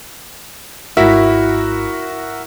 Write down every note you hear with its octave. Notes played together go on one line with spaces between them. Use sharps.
G#1 G#2 E4 F#4 A#4 E5